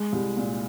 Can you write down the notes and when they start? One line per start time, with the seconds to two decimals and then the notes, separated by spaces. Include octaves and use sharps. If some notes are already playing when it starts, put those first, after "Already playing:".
Already playing: G#3
0.12 C2
0.37 A#2